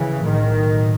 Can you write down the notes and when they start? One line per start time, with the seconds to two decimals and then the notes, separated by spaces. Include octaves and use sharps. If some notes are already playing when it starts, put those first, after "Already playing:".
Already playing: C#3 E3
0.24 B1 A2 D#3